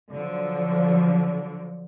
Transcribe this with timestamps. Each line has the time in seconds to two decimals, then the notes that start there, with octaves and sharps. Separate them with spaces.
0.11 D3 F3 F#3